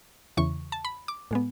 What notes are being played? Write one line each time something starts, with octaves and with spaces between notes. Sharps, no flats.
E2 C#3 E3 C#6
A5
B5
D6
A2 G#3 B3